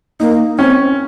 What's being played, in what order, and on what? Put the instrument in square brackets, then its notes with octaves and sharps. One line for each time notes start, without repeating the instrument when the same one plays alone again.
[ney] A#3 [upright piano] D#4
[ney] C4 [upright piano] C#4